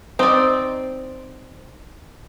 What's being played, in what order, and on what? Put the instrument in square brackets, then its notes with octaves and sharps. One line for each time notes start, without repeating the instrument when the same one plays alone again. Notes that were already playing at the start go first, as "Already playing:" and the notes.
[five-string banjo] C4 [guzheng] D#4 D5